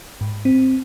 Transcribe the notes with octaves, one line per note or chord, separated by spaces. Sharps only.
G#2
C4